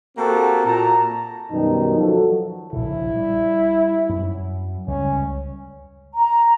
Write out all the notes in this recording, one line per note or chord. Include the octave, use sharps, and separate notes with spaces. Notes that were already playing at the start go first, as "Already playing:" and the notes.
A#3 C4 F#4 G4 A4
A#2 F#4 A5 A#5
F#2 B2 D#3 G3 D#4
F3 F#3 F#4 A4
A#1 C#3 E4
G3
F#2
C#2 G3 C#4
A#5